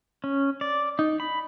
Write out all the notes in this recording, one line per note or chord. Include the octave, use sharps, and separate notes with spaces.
C#4
D5
D#4
B5